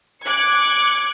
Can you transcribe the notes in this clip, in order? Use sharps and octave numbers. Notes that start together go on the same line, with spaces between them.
D6 F#6 G#6 C#7